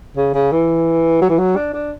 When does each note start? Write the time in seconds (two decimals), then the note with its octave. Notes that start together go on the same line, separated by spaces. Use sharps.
0.16 C#3
0.34 C#3
0.52 E3
1.21 F#3
1.29 E3
1.38 F#3
1.56 D4
1.73 D4